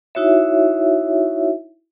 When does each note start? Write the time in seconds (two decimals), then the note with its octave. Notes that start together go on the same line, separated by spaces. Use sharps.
0.15 D#4 E4 F#4 C#5 E5